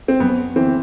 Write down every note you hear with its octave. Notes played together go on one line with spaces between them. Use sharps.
C4
F#2 B3
E3 C4